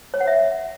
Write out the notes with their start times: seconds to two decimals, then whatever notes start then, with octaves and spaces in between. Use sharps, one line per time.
0.14 C#5
0.21 F#5
0.27 E5